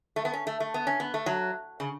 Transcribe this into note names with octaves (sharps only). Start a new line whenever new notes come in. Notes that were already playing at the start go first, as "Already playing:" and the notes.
A3
B3
C#4
A3
A3
B3
C#4
B3
A3
F#3
C#3